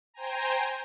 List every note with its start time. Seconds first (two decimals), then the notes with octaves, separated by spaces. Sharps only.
0.14 C5 G5 G#5 A#5